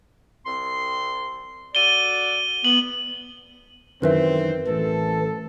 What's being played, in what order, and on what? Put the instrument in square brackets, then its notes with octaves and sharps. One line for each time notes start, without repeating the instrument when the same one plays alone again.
[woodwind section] C2 C4 C6
[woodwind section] F#4 A4 D5 [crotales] D#7 G7
[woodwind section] B3 [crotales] F#7
[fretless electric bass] F#2 D#3 E3 [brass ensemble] C4 [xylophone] A#4 B4 E5
[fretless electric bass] A1 [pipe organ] E3 [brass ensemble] A4